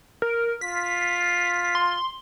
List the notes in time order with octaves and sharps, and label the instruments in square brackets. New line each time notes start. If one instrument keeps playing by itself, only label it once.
[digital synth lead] A#4
[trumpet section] F4 [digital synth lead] B6
[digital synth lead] C6